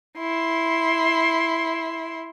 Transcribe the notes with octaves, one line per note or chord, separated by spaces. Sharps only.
E4 C6